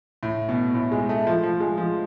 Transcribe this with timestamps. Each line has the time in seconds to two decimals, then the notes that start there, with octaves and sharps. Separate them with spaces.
0.23 A2
0.49 B2
0.74 A2
0.92 G#3
1.09 A3
1.27 F3
1.43 F3
1.60 G#3
1.78 F3